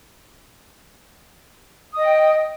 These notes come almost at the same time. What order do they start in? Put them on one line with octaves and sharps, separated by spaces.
D#6 D#5 G5